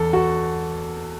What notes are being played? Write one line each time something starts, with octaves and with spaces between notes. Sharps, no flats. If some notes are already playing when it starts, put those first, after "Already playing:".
Already playing: E2 A4
F#4